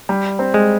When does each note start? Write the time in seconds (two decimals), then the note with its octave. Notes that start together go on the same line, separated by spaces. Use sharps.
0.09 G3
0.39 C4
0.54 G#3